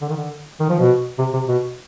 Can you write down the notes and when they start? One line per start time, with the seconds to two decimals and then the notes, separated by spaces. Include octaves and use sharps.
0.02 D3
0.09 D#3
0.16 D3
0.60 D#3
0.70 F3
0.80 B2
1.19 C3
1.34 C3
1.48 B2